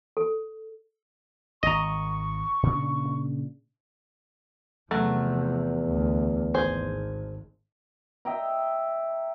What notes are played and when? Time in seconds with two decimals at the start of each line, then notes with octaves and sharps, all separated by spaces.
0.17 A4
1.63 G#1 D#5 A#5 C#6
2.63 A#2 C#3 D4
4.91 E2 C3 F3 F#3 A3
5.85 D2
6.54 G#1 G#4 C5
8.25 D#5 E5 G5 A#5